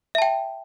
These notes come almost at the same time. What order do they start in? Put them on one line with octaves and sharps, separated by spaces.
E5 A5 G5